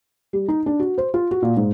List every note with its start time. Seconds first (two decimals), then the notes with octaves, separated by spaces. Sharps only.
0.33 G3
0.48 D#4
0.66 D4
0.80 F#4
0.98 C5
1.14 F4
1.31 F#4
1.42 A#2
1.57 G#2